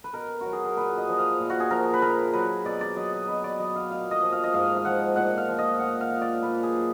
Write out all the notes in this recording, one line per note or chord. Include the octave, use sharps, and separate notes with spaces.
B4
B2 A#4
F#3 F#4
G#4
A#4
A#2 B4
D#5
F3 D#5
F5
A#2
F#4
G#4
F3 A#4
B4
A#2 A#4
F#3 B4
B2 D5
D5
F#3 D#5
D#5
B2 B4
D5
F#3 D#5
F5
A#2 F5
D#5
F3
F5
D#5
G#2 F5
F5
F3 F#5
A#2 F#5
F5
F3
D#5
A#2 F#5
F5
F3
D5
A#2 B4
G#4
F#3